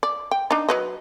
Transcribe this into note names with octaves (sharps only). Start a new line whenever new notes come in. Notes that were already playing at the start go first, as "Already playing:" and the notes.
D5
G5
D4 D#4
F#3 B4 D#5